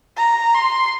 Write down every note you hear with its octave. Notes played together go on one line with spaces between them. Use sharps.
A#5
C6